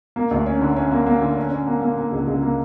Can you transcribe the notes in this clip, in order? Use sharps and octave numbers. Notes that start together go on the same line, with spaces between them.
A#3
D2
C#4
D3
C#4
A#3
A#3
D3
C#4
C#4
A#3
A#3
A#3
C#2
C#2
A#3